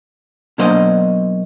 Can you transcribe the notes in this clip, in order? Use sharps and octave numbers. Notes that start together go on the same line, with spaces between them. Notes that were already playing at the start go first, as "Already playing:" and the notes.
B2 F#3 A#3 D4 C5 D#5